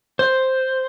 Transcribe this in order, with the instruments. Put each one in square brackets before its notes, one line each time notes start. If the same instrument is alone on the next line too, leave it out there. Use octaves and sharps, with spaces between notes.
[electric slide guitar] C5